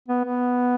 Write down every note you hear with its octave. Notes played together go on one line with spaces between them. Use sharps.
B3
B3